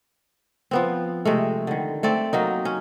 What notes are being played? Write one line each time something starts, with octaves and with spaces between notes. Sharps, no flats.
F3 B3 C4
C3 G#3 A3
D3 D#3
A3 C4 D5
F#3 A#3 D#4
C#4